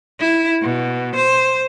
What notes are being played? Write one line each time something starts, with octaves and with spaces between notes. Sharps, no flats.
E4
B2
C5